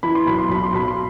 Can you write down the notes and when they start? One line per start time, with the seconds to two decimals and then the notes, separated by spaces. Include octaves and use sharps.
0.03 E3 B5
0.15 C6
0.26 B1 B5
0.38 C6
0.49 B1 B5
0.64 C6
0.73 B1 B5
0.88 C6